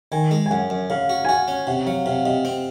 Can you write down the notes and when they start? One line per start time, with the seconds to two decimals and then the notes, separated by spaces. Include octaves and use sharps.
0.12 D#3 G#5
0.31 G#3
0.46 G#5
0.51 F#2 F#5
0.70 F#2
0.90 C#3 F5
1.09 F#4
1.25 G#5
1.29 F#4 F#5
1.48 C#4
1.67 C3 F#5
1.87 F#3 F5
2.06 C3 F5
2.25 C3 D#5
2.45 C4